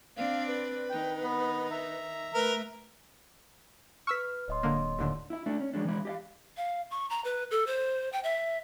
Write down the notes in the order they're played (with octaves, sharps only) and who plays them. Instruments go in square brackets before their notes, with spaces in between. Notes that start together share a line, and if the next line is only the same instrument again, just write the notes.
[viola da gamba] C4 D4 D5 [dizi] F5
[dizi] B4
[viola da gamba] D#3 D#4 [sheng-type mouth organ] G5
[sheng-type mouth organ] B3
E5 A#5
[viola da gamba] A3 [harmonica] A#4 [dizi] B4
[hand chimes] B4 F6 [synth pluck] C#6 E6 B6
[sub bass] D1 [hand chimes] C#5 D#5 C6
[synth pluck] D3 A#3
D#2 A2 D3
[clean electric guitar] E4 E5
A3 D4
C#4
F3 F#3 G#3 D4
E3 G#3 E4
G4 D#5 F5
[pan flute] F5
C#6
A#5
B4
A4
C5
G5
E5